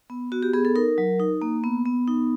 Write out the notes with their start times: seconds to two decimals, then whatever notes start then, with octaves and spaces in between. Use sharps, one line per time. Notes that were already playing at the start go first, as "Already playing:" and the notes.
0.10 B3
0.32 B3 F#4
0.43 G4
0.54 B3 G#4
0.65 A4
0.75 D#4 A#4
0.98 F#3
1.19 D#4
1.42 A#3
1.64 B3
1.85 B3
2.07 D#4